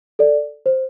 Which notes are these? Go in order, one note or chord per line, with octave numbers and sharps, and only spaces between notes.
A4 D5
C5